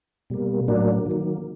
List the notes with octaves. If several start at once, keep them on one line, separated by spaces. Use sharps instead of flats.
B2 G3 A#3
A2 F#3 A#3 D4
D#3 F#3 A#3